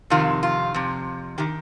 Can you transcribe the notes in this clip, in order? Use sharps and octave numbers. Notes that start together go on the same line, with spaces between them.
F2 C3 D#3 F4
F4
F2 C3
C3 D#3 G4